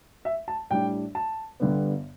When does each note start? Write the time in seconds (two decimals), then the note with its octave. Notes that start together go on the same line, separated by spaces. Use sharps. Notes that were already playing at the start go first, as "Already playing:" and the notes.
0.25 E5
0.48 A5
0.70 A2 G3 D4 G5
1.15 A5
1.60 G1 G2 D3 G3 B3